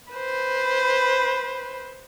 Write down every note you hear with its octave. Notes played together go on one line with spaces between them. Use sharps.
B4 C5